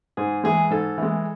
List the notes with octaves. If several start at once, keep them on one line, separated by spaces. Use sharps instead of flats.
G#2 G#4
E3 G#3 G#4
G#2 A4
E3 G#3